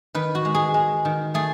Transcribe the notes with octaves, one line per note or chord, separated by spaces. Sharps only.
D#3 B4
F#4
G#3
G#4
G#3
D#3
A3 G#4